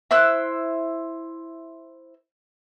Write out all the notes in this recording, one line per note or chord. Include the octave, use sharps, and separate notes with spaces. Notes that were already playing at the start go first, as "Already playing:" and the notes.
E4 C5 E6 F#6